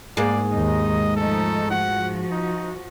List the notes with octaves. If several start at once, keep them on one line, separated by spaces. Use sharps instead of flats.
G#2 A#3 D5
D#2 D#4 D#5
F3 A3 D#4 A4
F3 F#4 F#5
D#4